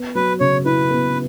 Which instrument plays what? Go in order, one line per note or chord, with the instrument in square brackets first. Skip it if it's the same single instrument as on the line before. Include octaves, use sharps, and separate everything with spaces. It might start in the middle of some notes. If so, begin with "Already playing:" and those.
Already playing: [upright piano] B3
[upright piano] F#3 [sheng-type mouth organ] B4
[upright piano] C#3 [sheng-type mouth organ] C#5
[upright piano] E4 [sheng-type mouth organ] B4
[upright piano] B3